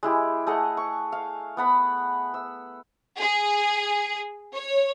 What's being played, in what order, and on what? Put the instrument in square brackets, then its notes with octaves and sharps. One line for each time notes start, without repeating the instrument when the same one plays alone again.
[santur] G#3 E4 G4
A3 G#4 D#5 F#5
C#6
F5
B3 F#5 B5
E6
[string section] G#4
C#5